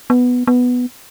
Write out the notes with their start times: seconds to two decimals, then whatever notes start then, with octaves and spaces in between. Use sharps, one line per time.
0.10 B3
0.47 B3